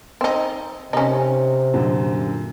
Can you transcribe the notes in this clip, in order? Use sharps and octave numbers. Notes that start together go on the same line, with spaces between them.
C4 D#4
C3 C#4 D#4
F#2 A#2 D3